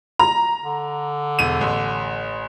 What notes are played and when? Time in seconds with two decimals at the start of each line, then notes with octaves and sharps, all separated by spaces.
0.19 A#5
0.64 D3
1.39 E1 D#7
1.61 A1